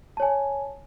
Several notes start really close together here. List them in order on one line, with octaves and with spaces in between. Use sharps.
A5 C#5 G#5